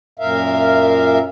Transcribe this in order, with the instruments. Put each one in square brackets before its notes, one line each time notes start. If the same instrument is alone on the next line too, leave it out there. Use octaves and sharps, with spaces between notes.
[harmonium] F#2 A#2 A#4 E5 F5